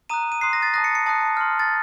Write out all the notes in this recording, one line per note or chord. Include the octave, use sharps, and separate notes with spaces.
A#5 D#6 F#6 D#7
D#7
C6 D#6 F#6 C7
A#6
A6
A5 D#6 F#6 A#6
C#7
C#7
A5 D#6 F#6
C6 F6
A6